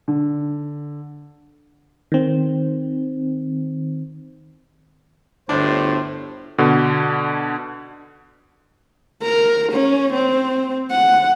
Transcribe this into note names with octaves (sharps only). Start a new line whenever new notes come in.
D3
D#3 C4
G1 D2 A2 D4 C5
B2 D3
A#4
C#4
C4
F#5